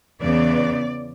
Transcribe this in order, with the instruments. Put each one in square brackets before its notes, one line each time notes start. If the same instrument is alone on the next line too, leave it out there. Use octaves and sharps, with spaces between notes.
[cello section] E2 C#3 E3 B3 D5